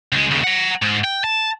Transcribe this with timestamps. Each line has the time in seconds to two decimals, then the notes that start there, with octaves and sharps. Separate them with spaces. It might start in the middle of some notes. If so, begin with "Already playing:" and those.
0.12 C#2 G#3
0.31 D#2 C#3
0.44 F#5 A#5
0.82 G#2
1.04 G5
1.24 A5